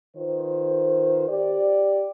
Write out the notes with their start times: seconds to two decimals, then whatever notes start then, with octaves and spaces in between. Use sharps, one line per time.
0.17 D#3 F4 B4 C5
1.29 G4 D5